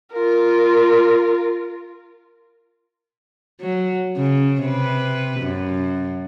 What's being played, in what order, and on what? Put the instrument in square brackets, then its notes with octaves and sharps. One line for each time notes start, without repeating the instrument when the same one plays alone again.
[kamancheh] F4 A#4
[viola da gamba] F#3
C#3
C3 B4
F#2